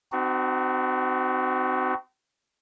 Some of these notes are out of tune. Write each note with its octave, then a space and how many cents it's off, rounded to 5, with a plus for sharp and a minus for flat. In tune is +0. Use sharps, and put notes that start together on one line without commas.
C4 -35 D#4 -35 F#4 +15